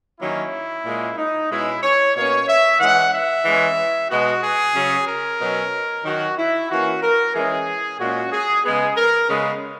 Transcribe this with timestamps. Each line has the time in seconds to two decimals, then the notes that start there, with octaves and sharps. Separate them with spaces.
0.20 D#3 F#3 A#3 C#4 E4
0.85 A#2 G#3 C#4
1.18 D#4
1.50 B2 G#3 C#4 E4
1.83 C#5
2.15 B2 A#3 C#4 C#5
2.48 E5
2.80 E3 G#3 C#4 F#5
3.12 E5
3.45 E3 G#3 C#4
4.10 B2 G#3 B3 F#4
4.42 G#4
4.75 C#3 F#3 C#4
5.07 A#4
5.40 B2 F#3 C#4
6.04 D#3 F#3 C#4 F#4
6.38 E4
6.70 E3 A#3 C#4 F#4
7.03 A#4
7.34 E3 G#3 C#4 G#4
7.99 A#2 G#3 C#4 F#4
8.32 G#4
8.64 C#3 G#3 B3 G#4
8.97 A#4
9.30 C#3 G#3 B3